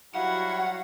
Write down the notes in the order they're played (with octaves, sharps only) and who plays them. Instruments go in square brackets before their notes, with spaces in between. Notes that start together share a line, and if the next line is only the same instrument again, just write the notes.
[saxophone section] F#3 G3 F5 [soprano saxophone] E4 [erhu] F#4 [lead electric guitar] F#5